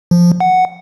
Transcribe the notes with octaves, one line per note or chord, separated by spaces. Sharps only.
F3
F#5